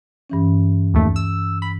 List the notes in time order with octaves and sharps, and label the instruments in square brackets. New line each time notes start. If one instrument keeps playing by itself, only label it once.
[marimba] G2 E3 C#4
[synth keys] D#2 A3
E6
B5